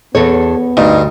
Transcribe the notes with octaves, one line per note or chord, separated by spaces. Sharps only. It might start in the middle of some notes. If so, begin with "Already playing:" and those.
E2 B3 A4 C#5
D2 G2 D#4